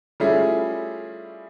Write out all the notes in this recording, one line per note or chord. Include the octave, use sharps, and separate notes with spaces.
G3 A3 C#4 E4 F4 G#4